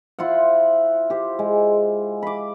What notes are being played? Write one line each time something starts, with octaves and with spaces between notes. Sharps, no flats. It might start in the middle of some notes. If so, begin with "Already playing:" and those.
E4 F4 C5 F#5
G4 C5
G#3
B5 D6